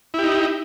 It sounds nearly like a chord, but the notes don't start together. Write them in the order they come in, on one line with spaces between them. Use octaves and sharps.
E4 G4 D#4